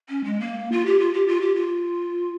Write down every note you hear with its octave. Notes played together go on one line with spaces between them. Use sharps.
C#4
G#3
A#3
F4
G4
F4
G4
F4
G4
F4